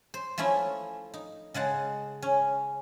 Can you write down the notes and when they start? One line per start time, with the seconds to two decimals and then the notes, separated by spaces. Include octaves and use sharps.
0.14 C5
0.38 F3 A3 C#4 E4
1.14 D#4
1.54 C#3 G#3 F#5 A5
2.22 C#4